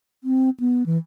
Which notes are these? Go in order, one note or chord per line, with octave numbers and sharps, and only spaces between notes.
C4
B3
E3